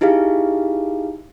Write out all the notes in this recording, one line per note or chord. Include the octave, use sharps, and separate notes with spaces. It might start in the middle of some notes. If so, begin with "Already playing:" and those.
D#4 E4 G4 G#4 F5